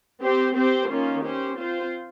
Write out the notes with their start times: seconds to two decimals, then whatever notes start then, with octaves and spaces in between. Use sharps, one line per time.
0.22 C4 G4 C5
0.55 C4 G4 C5
0.90 D#3 A#3 C#4 F4
1.23 C#4 G4 C5
1.57 C4 F4 C5